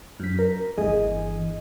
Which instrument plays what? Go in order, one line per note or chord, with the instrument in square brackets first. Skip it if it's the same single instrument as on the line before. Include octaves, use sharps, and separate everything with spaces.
[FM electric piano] F#2 B6
A#4
[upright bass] G1 E3 [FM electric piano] G#4 D#5